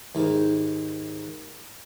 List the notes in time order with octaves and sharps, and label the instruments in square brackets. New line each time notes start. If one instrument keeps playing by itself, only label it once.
[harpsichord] D#2 G#2 D#3